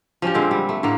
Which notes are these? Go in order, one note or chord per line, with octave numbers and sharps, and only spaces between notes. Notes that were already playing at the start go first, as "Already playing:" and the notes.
F3 C#4 D4 G4
A#2 D3 G#3 C4
G3
A3
A2 D3 A#3 C4